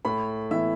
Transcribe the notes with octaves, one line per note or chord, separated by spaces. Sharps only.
A2 B5
E3 B3 E4 E5